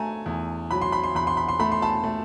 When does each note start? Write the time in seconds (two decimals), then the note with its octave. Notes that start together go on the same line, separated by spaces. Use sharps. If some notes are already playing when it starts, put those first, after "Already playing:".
Already playing: F#3 A3 G#5 A#5
0.26 E2
0.71 F#3 B5
0.82 C6
0.92 B5
1.04 C6
1.15 E2 B5
1.27 C6
1.37 B5
1.49 C6
1.60 A3 B5
1.72 C6
1.82 A5 B5
2.04 A3